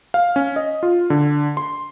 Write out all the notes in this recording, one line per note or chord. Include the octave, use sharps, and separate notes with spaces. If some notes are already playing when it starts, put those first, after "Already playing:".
F5
C#4
D#5
F4
D3
C6